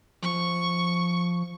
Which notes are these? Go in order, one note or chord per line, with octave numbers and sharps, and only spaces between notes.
F3 C#6